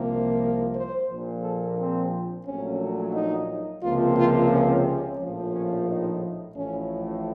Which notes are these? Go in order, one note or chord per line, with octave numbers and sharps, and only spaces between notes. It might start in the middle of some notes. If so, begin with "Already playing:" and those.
Already playing: C2 C3 F3 A#3
C5
A#1 A#2 F3
A4
C4
A#1 A#2 F#3 A3 C#4
D#4
C#2 C3 F3 A#3 F4
F4
C#4
C#4
A#1 A2 F3
C#4
D#4
A1 A2 F3 A3 C#4